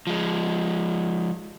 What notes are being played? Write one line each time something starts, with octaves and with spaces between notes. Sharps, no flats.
F3 G#3